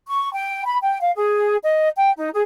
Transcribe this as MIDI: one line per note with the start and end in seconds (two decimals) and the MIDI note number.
0.07 0.30 85
0.33 0.64 79
0.65 0.77 83
0.81 0.98 79
1.01 1.10 77
1.15 1.56 68
1.63 1.88 75
1.96 2.11 79
2.17 2.29 63
2.32 2.41 68